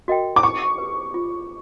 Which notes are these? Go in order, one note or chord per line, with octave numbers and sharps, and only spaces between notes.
F#4 A#4 D#5 G5
D6
D#4 C#6
G4 B4
F4